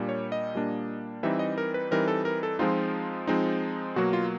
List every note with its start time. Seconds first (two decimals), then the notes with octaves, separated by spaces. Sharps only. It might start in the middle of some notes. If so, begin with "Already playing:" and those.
Already playing: A#2 G3 A#3 D4
0.09 C#5
0.32 D#5
0.55 A#2 G3 A#3 D4
1.23 E3 G3 C4 D#4 E5
1.39 D#5
1.58 A#4
1.74 B4
1.91 E3 G3 C4 D#4 A#4
2.08 A4
2.25 A#4
2.43 A4
2.59 F3 G#3 C4 D#4 F4
3.27 F3 G#3 C4 D#4
3.96 B2 F#3 A#3 F#4
4.13 F4